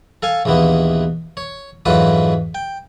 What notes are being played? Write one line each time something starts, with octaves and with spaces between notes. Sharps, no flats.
A4 F5 G#5
A#1 D#2 E3 A#3 B3
C#5
F2 G#2 E3 F#3 F4 B4
G5